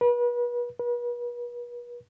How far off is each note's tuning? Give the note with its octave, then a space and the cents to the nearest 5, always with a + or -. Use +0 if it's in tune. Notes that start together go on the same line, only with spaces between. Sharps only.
B4 -35
B4 -40